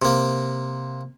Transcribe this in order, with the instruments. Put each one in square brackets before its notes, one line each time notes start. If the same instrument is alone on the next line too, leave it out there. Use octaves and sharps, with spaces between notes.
[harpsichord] C3 A#3